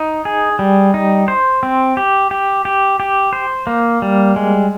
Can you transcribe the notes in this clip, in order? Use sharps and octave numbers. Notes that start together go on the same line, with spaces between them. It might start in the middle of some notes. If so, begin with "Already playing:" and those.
Already playing: D#4
G#4
G3
D#4
C5
C4
G4
G4
G4
G4
C5
A#3
G3
G#3